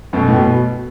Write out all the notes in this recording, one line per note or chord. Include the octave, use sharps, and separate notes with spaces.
F#2 B2 A3
A2
B2 F#4